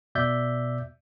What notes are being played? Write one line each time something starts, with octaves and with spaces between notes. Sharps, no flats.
B2 D5 E5 G6